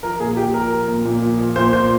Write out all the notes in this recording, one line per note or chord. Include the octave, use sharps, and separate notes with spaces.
F3 A#4
A#2 G#4
A#2 G4
F3 A#4
F3
A#2
A#2
F3
F3
A#2 C5
A#2 C5